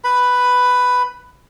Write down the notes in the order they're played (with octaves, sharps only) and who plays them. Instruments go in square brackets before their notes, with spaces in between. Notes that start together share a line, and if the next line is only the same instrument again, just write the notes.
[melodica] B4 B5